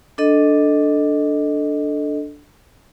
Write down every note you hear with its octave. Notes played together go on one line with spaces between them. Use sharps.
D4 A4 D#5